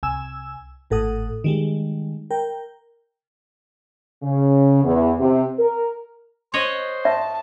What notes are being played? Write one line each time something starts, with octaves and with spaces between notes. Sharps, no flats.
C2 G#5 E6
G#1 A2 A4 F#5 D#6
D#3 G3 G#3
A#4 G5
C#3
E2
C3
A#4
C5 C#5 D#5 F#5
E5 A5